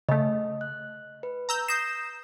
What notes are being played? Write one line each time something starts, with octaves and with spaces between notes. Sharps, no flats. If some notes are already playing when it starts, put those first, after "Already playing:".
C#3 A3 D#5
F#6
B4
A#5 E6 G6
D#6 G6 A#6 C7 E7